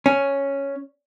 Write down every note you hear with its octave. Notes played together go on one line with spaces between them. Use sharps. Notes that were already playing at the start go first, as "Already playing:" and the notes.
C#4